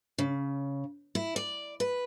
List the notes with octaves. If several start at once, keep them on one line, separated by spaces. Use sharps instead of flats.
C#3
E4
D5
B4